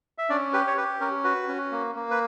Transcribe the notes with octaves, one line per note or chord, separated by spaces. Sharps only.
E5
C#4 D4 D5
G4 B4
C#5
G4 B4
C#4 A#4
F#4 B4
C#4
A#3
A#3
B4